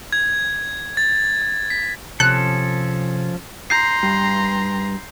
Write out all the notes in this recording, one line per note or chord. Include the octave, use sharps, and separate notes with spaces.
G#6
A6
B6
C3 F3 C#4 A4 F#6
A#5 C6 G6 C7
G2